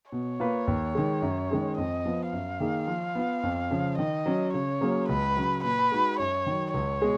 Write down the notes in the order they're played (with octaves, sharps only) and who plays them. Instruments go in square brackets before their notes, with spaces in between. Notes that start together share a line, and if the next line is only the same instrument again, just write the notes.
[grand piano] B2 [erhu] C#5
[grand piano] A#3 F4 B4
D#2
D#3 G#3
F#2
D#3 G#3 C#4 G#4
[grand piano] F2 [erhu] D#5
[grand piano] F3 B3 F4
[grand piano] F#2 [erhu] F5
[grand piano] D#3 A#3 D#4 G#4
F3
B3 F4
F2
C#3 F3
[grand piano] D#3 [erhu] D#5
[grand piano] F#3 C#4
[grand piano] C#3 [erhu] C#5
[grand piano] F#3 A#3 C#4 G#4
[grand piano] C#2 [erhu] B4
[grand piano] C#3 F#3
[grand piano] A#2 [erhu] B4
[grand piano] G#3 D#4 F#4
[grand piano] F#2 [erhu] C#5
[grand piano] D#3 F#3
[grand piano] C#2 [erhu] C#5
[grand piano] B2 G#3 G#4